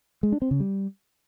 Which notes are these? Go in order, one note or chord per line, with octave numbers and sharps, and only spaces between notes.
G#3
D4
C4
C#3
G3